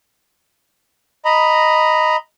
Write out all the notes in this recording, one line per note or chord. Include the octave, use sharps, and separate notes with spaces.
D#5 A#5 B5